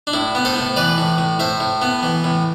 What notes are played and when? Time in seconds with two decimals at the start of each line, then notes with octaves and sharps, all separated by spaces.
0.07 D4
0.13 A2 E4
0.35 B3
0.45 A4 C5
0.56 A2
0.76 E3 B4 D5
0.98 A2
1.18 A2
1.39 A2 C5 E5
1.60 A2
1.82 B3
2.03 E3
2.24 A2